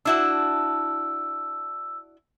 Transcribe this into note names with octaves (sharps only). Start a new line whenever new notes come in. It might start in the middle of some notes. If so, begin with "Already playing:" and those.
D4 E4 F#4 E6